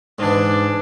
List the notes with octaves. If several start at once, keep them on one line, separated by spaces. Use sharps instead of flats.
G#2 E3 D4